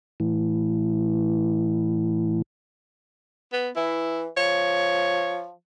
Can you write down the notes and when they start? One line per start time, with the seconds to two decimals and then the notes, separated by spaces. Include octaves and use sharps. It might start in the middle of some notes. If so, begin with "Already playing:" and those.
0.20 A2 E3
3.52 B3
3.76 E3 E4
4.37 F3 C#5